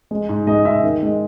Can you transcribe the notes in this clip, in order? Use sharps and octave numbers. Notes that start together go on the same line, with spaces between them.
G#3
G#2
G#3 D#5
G#2 E5
D#3
G#3